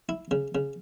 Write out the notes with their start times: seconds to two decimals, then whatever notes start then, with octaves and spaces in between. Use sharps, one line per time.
0.09 E4
0.31 C#3
0.55 C#3